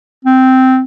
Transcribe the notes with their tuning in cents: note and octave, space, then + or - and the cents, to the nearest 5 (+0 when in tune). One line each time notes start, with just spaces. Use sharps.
C4 -10